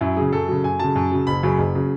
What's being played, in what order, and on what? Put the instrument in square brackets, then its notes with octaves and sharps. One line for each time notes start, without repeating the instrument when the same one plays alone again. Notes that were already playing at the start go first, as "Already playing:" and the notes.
[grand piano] F#2 E4
C#3 F#3 G#4
F#2 A4
C#3 F#3
F#2 G#5
C#3 F#3 A5
F#2
C#3 F#3
F#1 B5
F#2 C#3 F#3
F#1
C#3 F#3